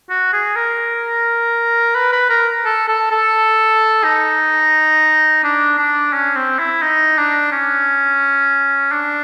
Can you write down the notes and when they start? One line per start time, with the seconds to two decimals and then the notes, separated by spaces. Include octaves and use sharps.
0.10 F#4
0.33 G#4
0.56 A#4
1.95 B4
2.13 B4
2.30 A#4
2.66 A4
2.88 A4
3.12 A4
4.04 D#4
5.44 D4
5.78 D4
6.13 C#4
6.36 C4
6.59 E4
6.83 D#4
7.18 D4
7.52 C#4
8.92 D4